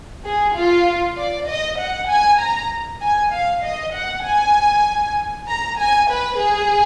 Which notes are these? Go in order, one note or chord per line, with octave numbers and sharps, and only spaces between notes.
G#4
F4
D5
D#5
F#5
G#5
A#5
G#5
F5
D#5
F#5
G#5
A#5
G#5
B4
G#4